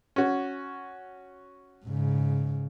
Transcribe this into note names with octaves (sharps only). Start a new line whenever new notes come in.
C#4 F#4
G#2 C#3